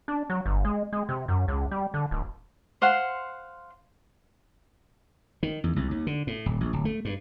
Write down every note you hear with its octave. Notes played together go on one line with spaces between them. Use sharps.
D4
F#3
G1
G#3
G#3
C3
F#2
C#2
G3
D3
D1
C5 F5 F#5 C6
D#3
E2
C2
D#2
D3
A2
D#1
A#1
D1
A3
G2